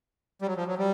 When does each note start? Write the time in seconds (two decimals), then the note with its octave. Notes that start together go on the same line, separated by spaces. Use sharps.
0.42 G3
0.47 F#3
0.57 F3
0.67 F#3
0.78 G3